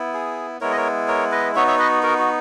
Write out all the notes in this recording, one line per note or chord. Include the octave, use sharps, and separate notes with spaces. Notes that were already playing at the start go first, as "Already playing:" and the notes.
Already playing: B3 E4
G#4
G#3 B3 E4 A#4 C#5
D#5
A#4 C#5
A#4 C#5
B4 D#5
B3 D#4 F#4 C#5 E5
C#5 E5
B4 D#5
F#4 A#4
F#4